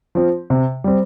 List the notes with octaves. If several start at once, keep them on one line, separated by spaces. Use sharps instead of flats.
F3 C4
C3
G3 C4